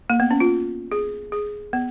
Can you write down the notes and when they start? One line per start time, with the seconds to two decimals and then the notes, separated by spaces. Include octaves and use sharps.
0.10 A#3
0.20 B3
0.31 C#4
0.40 F4
0.92 G#4
1.32 G#4
1.73 B3